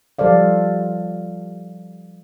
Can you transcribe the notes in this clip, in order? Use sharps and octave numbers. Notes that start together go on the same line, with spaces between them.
F3 G3 A4 C5 D5 F5